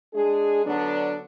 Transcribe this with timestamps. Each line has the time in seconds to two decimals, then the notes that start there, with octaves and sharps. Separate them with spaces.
0.14 G#3 D4 G#4
0.65 D3 F#3 B3 D4